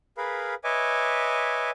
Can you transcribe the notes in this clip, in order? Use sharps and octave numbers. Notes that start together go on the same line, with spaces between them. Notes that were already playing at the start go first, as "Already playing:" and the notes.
G#4 A#4 B4 F5 B5
B4 C#5 D#5 E5 G#5 D6